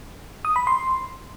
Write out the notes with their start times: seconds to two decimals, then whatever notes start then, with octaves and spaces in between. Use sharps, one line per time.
0.45 D#6
0.56 B5
0.67 C6